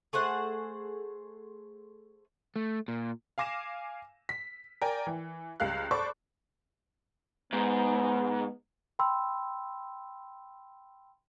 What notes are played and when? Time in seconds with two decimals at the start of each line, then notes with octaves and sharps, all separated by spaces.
0.13 A3 G#4 C5 F#5
2.56 A3
2.88 A#2
3.38 F5 G#5 D6 A#6 E7
4.29 B6
4.82 A#4 D5 G5 G#5
5.07 E3
5.60 C#2 G3 F5 F#6
5.91 A4 C5 D5 B5 C#6 D6
7.53 G#2 B3
8.99 G5 B5 C6 E6